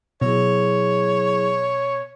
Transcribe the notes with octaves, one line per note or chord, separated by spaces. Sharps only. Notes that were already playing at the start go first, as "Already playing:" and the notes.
B2 F#3 E4 G#4 C#5